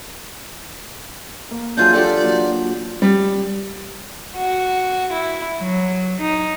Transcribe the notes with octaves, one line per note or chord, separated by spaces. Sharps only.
A#3
E3 F#3 D4 F4 G#4 A5 G6
D4 F4 G4 A4 D5
F#3 A#3 F#4
G3
F#4
E4
F#3
D#4